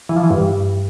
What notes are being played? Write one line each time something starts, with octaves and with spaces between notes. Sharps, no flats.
E3
F3
E3
G2